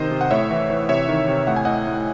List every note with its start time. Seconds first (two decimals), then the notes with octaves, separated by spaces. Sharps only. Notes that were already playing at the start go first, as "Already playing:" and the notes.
Already playing: C3 D#3 C5 D#5
0.11 C3
0.21 F#5
0.31 A2 C#5 E5
0.51 E3
0.70 E3
0.89 C3 C#5 E5
1.09 D#3
1.28 C3
1.47 A2 F#5
1.56 G#5
1.65 A2 D#5 F#5
1.87 A2